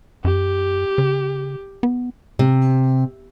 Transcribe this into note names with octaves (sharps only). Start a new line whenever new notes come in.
F#2 G4
C#3
B3
C3